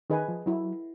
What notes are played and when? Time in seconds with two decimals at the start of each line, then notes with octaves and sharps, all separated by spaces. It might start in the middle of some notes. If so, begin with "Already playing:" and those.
0.10 D#3 G#4 B4 D#5 G#5
0.29 F3
0.46 F#3 E4